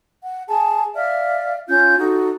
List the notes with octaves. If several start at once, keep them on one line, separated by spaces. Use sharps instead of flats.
F#5
G#4 G#5 A5
D5 E5 F5 F6
C#4 F4 G6
D#4 F#4 A4